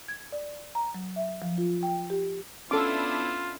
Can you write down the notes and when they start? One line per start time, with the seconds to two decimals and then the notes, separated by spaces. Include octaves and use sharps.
0.08 G#6
0.32 D5
0.75 A#5
0.95 F#3
1.16 E5
1.42 F3
1.58 F4
1.83 G5
2.10 G4
2.71 B3 C#4 D4 E4 F4 A4 D6